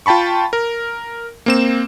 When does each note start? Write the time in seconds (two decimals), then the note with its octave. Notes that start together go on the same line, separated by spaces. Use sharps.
0.06 F4 G5 A5 B5 C#6
0.53 A#4
1.46 A#3 C4 E7